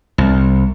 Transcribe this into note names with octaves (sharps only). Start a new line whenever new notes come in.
C2